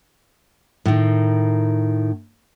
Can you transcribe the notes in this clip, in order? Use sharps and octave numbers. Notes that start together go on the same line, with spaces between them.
A2 D#3